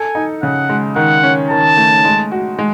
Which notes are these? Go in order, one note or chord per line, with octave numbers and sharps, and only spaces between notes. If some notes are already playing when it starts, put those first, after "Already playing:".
Already playing: A4 G#5
D#4
C#3 F#5
G#3
D#3 F#5
C#4
D#3 A5
A3
G#3
F#4
G#3